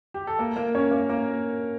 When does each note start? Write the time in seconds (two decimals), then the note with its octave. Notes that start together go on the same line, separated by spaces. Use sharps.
0.14 G4
0.27 A4
0.39 A#3 A#4
0.56 A#3 A#4
0.75 C#4 C#5
0.91 A#3 A#4
1.09 A#3 A#4